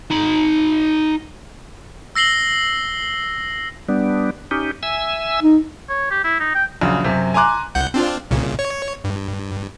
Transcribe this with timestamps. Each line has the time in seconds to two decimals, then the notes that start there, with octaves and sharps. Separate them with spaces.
0.10 D#4 B5
2.15 E6 A#6 C7 F#7 G7
3.89 G3 B3 D4
4.51 C#4 D#4 G4
4.83 E5 G#5 E6
5.41 D#4
5.90 C#5
6.11 G4
6.24 E4
6.40 D#4
6.55 G5
6.81 A#1 C#3 F#3
7.04 F#2 C3
7.34 G#5 A#5 C6 D6 F#6
7.75 C2 F#5 G6
7.94 C4 D4 F4
8.31 C2 A#2 C#3
8.59 C#5
9.04 G2